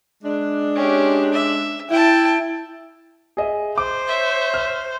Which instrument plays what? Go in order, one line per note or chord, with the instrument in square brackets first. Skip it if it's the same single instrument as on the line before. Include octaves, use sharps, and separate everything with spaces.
[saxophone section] G#3 D4
[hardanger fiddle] C#4 G4
E5
[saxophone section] E4 [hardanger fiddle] G5 A5
[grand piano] G#4 D#5 E5
[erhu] C5 [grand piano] D6
[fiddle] C#5 E5
[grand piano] F6